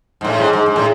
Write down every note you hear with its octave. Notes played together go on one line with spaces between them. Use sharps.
G#2
A2
G#2
G#2
G#2
A2